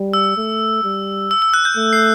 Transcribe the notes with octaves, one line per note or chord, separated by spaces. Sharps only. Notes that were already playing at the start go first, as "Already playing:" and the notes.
Already playing: G3
E6
A3
G3
E6
E6
F#6
G6
A3
C7